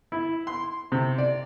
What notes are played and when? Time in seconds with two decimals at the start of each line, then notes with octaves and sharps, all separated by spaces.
0.12 E4
0.47 C6
0.92 C3
1.18 D5